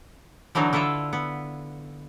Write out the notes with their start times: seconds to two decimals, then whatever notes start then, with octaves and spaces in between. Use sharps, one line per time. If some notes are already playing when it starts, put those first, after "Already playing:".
0.55 D3 E3 F#3 D4 D#4
0.73 D3 E4 F4 A4 E5
1.13 B3